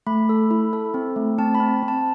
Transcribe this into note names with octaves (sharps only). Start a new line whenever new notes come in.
A3 B5
A4
E4
A4
C4
A3
C4 A5
B5
C4
C4
A5